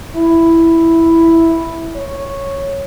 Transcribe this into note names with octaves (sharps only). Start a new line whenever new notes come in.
E4
C#5